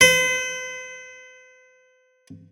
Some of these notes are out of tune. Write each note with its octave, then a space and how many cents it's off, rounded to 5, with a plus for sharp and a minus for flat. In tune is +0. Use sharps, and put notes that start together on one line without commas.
C5 -45